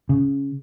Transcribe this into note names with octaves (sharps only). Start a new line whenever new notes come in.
C#3